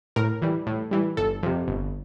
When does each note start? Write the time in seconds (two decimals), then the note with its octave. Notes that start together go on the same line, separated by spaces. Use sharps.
0.16 A2 A#4
0.42 E3 G3
0.67 A2
0.91 E3 G3
1.17 G1 A4
1.43 F2 C3
1.68 G1